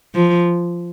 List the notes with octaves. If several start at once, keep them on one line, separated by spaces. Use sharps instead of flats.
F3